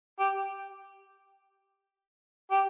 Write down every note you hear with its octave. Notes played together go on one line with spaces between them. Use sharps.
G4
G4